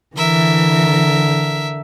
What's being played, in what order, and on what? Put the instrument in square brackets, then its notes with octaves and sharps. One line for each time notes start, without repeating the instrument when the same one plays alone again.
[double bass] D3 [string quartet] E3 [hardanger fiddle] A#4 E5